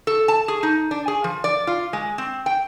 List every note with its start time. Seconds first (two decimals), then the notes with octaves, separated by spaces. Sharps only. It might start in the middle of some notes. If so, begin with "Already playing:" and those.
0.07 A4
0.28 A5
0.48 G#4
0.63 D#4
0.91 D4
1.08 G#4
1.24 F3
1.44 D5
1.67 F4
1.93 G#3
2.18 C4
2.46 G5